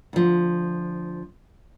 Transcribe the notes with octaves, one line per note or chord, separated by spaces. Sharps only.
D2 F3